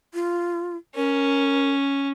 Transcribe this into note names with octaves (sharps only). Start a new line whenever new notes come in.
F4
C#4 A#4